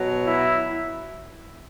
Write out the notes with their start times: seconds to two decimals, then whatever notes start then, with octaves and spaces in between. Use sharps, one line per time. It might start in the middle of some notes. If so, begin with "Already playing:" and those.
Already playing: B2 F#3
0.25 E4